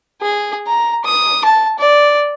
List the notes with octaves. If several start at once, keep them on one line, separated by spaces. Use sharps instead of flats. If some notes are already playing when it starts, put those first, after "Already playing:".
G#4
A#5
D#6
A5
D5